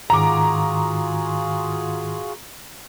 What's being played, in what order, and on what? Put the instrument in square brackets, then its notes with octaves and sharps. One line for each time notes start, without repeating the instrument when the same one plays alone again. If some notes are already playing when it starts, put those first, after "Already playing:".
[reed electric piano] G#2 D#3 [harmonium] F4 F#4 G#4 [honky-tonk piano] A#5 D6